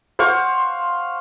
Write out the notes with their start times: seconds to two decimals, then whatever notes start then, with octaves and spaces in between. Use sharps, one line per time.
0.19 C5 F5 F#5 C#6